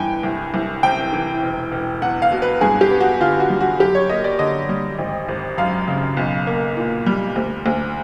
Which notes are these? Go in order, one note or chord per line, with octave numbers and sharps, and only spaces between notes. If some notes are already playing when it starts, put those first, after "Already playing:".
Already playing: G1 G2 E3 G5 G#5
C2
C2
C3 G5
E3
E1
E1
E2 F#5
F5
B2
B4
G2 G#4
G4
B3
F#4
D3 F4
F#4
G3
F#4
F#2 G4
C#5
A#3 D#5
D5
D3 D#5
G3
G#1
G#1
F#2 F5
C#3
B1
A#3
A#2
G3
D2
D2